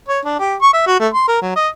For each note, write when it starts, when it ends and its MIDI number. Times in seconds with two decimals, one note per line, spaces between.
0.09 0.20 73
0.25 0.36 62
0.40 0.55 67
0.62 0.72 85
0.73 0.84 76
0.87 0.99 66
0.99 1.08 57
1.14 1.28 84
1.28 1.41 70
1.42 1.53 54
1.56 1.68 75